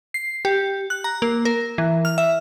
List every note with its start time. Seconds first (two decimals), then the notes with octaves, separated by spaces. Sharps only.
0.14 C7
0.45 G4
0.90 F#6
1.04 A#5
1.22 A#3
1.45 A#4
1.78 E3
2.05 F6
2.18 E5